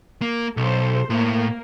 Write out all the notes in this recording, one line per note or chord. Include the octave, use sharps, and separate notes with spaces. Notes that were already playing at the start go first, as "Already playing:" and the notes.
A#3
B1 A4 C5
A2 A#3